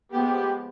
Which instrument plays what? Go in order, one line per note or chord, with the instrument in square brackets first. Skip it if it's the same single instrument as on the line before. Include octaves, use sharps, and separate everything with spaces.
[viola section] F3 G#3 B3 [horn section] G4